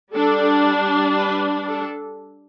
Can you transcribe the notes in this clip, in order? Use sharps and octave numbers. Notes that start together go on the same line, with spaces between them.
G3 D4 A4
B4
A4